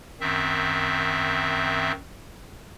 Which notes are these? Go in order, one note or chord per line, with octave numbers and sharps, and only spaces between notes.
F#2 D#3 C4 E5